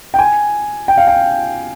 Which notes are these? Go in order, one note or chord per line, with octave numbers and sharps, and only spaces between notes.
G5
G#5
G5
F5
G5